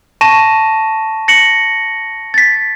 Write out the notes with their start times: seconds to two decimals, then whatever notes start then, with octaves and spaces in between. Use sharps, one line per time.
0.21 A5 C#6 A#6 D#7 E7
1.28 A#6 C#7 F#7
2.34 A6 B6